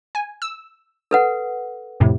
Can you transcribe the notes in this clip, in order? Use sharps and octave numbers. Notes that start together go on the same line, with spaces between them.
G#5
E6
A4 B4 F#5
F2 A2 C3